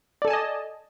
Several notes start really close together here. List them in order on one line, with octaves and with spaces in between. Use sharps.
D5 A4 G#5 A5 D#5